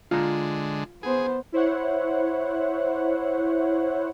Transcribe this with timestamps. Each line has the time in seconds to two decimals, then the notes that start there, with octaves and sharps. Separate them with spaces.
0.11 D3 G#3 F4 A#5
1.03 B3 G#4 C5
1.52 E4 C5 C#5 F#5